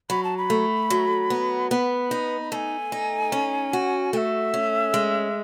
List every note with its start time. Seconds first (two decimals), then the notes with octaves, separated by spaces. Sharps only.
0.10 F#3 B5
0.24 A5
0.38 B5
0.50 A3
0.90 F#3
1.30 B3
1.71 B3 B5
2.11 D#4
2.52 A3 G#5 A5
2.92 D#4
3.32 C#4
3.73 F#4
4.13 A3 G#5
4.17 E5
4.54 C#4
4.94 G#3